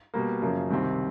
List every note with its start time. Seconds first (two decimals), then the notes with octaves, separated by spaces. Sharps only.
0.14 B2 G3 A#3
0.42 F#2 C#3 F3 A#3
0.70 C2 C3 D#3 G3 C4